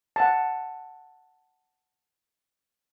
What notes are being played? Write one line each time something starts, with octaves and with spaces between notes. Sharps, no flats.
F#5 A5